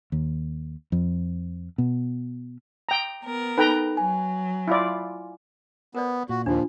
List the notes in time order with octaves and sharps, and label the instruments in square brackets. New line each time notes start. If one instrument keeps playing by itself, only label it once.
[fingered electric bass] D#2
F2
B2
[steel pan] G5 A#5
[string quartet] B3 A#4
[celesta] D#4 A4 [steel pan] B4 G5 A#5
[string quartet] F#3 [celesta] G#5
[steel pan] E4 F4 D5
[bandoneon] B3 [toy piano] A#4 C5 D5
[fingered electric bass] A#2 [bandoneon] F#4
[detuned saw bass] D#2 [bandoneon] F3 [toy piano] D4 F4